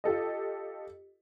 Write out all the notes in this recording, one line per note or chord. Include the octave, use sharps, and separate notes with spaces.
F4 G4 A4 D#5